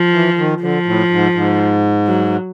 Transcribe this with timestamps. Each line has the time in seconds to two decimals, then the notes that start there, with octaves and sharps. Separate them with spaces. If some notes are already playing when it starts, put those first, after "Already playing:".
Already playing: F3
0.13 E3
0.37 D#3
0.62 D3 F3
0.86 A2
1.11 G#2
1.35 G#2
2.07 F#3